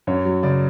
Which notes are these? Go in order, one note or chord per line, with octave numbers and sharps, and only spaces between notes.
F#2 C#5
F#3
C#3 D5